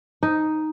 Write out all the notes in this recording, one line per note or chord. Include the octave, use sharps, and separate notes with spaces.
D#4